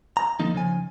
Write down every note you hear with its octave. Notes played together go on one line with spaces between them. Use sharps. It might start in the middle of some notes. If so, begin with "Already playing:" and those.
A#5
D3 F3 A#3 D#4
C#3 F3 G#5